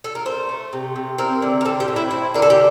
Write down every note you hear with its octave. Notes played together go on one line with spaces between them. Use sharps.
A4
A#4
A3 C5
A3
C3
C3
C4 A#4
D3
A#4
C4 A4
G4
A2
E4
C4 E4
D3 A#4
A4
G4